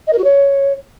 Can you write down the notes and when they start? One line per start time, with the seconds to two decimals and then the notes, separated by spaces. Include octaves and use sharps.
0.07 D#5
0.13 A#4
0.18 F#4
0.24 C#5